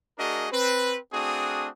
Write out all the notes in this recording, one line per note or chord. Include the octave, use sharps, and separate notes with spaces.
A3 D4 F#4 G#4 A#4 D#5
C4 B4
A3 C4 D4 F#4 G#4 D#6